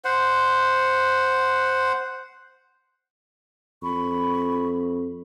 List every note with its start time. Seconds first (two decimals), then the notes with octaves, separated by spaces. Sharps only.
0.05 C5 F#5
3.82 F2 B5 C#6